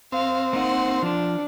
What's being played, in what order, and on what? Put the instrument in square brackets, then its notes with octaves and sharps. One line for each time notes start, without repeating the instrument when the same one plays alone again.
[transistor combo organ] C4 [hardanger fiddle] F5
[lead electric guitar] A#3 D#4 [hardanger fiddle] F#5 C6
[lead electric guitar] F3 [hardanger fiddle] D4